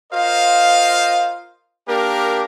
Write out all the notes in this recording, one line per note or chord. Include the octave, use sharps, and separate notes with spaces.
F4 A#4 C5 D#5 F5
A#3 D4 G4 A#4